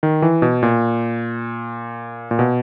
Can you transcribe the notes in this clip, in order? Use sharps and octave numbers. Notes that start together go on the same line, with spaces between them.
D#3
E3
B2
A#2
A#2
B2